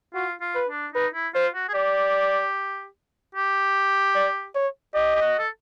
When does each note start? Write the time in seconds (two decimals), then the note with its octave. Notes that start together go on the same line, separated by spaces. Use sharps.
0.14 F4 F#4
0.41 F4
0.55 B4
0.68 D4
0.94 D#4 B4
1.14 E4
1.34 F4 C5
1.55 F#4
1.69 G#4
1.74 G4 D5
3.35 G4
4.15 D5
4.55 C#5
4.94 G4 D#5
5.16 G4
5.21 F#4
5.39 A4